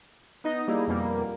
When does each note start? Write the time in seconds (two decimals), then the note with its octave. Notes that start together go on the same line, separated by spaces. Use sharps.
0.44 B3 D#4 D#5
0.68 G3 A#3 D#4 E4 G#4
0.88 F2 B2 G3 A#3